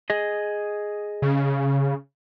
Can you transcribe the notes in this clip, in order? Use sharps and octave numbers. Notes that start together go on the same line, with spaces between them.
G#4 D#5
C#3